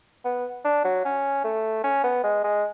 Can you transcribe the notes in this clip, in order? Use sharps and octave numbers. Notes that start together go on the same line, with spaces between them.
B3
D4
F#3
C#4
A3
C#4
B3
G#3
G#3